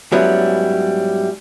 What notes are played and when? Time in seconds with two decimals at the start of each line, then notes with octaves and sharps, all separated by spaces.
0.12 G#2 F#3 G3 B3 C#4 E4